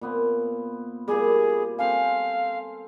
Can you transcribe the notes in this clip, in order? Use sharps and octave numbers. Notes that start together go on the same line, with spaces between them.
A#2 B3 C4
A#2 G3 G#4
C4 A4 F5 G#5